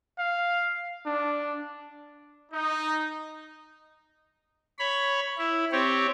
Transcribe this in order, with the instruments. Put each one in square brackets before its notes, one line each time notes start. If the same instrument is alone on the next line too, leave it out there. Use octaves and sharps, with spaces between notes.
[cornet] F5
D4
[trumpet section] D#4
[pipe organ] C#5 B5
E4
C4 G4 C#5